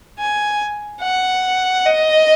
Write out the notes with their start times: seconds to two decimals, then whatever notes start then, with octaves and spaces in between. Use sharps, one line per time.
0.20 G#5
1.02 F#5
1.85 D#5